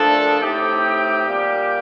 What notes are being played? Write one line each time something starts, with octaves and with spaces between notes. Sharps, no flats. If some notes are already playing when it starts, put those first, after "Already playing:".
Already playing: A#2 F3 A3 D4 A4
A2 A3 C4 D#4 G4
A#2 G3 A#3